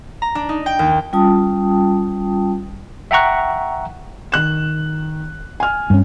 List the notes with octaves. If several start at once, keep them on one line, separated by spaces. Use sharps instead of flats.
A#5
D4
D#4
G5
D#2
G3 C#4 F4 G5 A5 D#6
E5 F#5 G5 A#5 C#6 F#6
D#3 F#6 E7
G#5 F6
G2 C#4